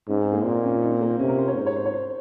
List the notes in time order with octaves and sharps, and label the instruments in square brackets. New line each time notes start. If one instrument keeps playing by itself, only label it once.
[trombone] G#2 [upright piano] C#4
[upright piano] C4
A#3
[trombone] A#2 [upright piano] C4
[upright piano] C#4
F4
D#4
C4
A#3
C4
[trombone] C3 [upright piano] C#4
[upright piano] A#4
C5
C#5
[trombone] G#2 [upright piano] C5
[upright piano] C#5
C5
C#5
C5